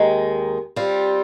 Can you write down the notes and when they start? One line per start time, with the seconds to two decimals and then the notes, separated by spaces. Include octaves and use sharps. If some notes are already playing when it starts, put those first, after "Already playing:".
Already playing: D#2 D#3 G#3
0.76 G3 C4 F4